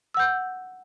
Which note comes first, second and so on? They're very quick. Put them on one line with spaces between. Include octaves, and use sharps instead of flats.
E6 F#5 G6